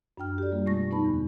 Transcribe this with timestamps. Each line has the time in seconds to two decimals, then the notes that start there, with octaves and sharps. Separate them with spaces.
0.17 F#2 D4 G5 F6
0.38 G4 A4 D5
0.52 G3 A#3 F4
0.66 B2 G#3 A3 C#6 A#6
0.91 B3 D#4 B4 A5 B5
1.05 E2 D3